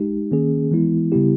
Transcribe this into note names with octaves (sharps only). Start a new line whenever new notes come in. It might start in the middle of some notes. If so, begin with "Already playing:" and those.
Already playing: G#3 D#4 G4
D#3 A#3 C#4 G#4
E3 G#3 B3 E4
C#3 G3 B3 E4 G4